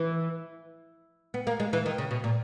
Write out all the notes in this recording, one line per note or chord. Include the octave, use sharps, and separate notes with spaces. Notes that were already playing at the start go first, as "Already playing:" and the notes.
Already playing: E3
B3
A#3
G#3
E3
D#3
C#3
B2
A#2